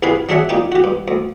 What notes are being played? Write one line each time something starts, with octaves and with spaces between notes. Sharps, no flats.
C2 G2 C4 G#4 B4 F5
F#3 D4 G#4 C#5 E5 F#5
A#2 D#4 G4 G5
F#4 G4
G2
D2